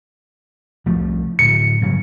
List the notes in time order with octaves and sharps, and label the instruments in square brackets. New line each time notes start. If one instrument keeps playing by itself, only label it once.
[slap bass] C2 F3 A3
[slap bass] D1 [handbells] C#7
[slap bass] G2 C#3 F#3